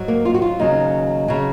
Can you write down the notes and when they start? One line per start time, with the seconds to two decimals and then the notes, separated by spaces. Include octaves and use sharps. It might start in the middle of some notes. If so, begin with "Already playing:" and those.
Already playing: G#2 F#3
0.08 A#3
0.25 F4
0.34 F#4
0.42 F4
0.59 D#2 C#3 F#3 D#4
1.28 C#3 F#3